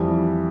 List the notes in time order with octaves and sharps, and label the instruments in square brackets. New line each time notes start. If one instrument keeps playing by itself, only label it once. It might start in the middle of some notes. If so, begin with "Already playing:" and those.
Already playing: [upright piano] F2 E3 G3